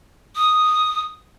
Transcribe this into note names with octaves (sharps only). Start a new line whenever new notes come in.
D#6